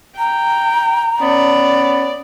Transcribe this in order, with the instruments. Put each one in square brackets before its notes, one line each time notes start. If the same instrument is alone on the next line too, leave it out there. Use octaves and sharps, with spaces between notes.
[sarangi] G5 [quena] A#5
[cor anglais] B3 [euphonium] C#4 [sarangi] D5